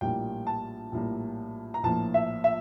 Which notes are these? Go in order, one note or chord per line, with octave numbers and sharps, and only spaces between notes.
A#1 A2 G3 A#3 G5
A5
A#1 A2 G3 A#3
A#5
A#1 A2 F3 A#3 A5
E5
E5